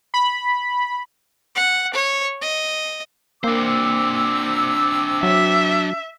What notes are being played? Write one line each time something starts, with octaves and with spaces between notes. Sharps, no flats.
B5
F#5
C#5
D#5
A#3 C4 D4 C5 D6 E6
F#3 E5